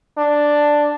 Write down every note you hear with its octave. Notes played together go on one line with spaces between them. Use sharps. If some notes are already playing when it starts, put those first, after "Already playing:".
D4